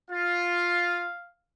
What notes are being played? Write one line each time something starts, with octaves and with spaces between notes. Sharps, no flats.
F4 F5